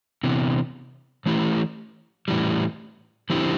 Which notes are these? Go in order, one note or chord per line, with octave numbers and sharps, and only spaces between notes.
C3 E3 B3
E3 A3 E4 G4
A2 E3 G3
D3 F3 C4 E4 G4